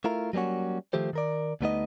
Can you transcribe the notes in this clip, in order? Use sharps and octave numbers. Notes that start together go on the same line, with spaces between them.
A3 E4 F4 A#4
F#3 G3 A#3 C#4 F#4
D#3 F3 A3 G4 C5
D#3 A#4 D5
D2 G3 A3 B3 D#4 D#5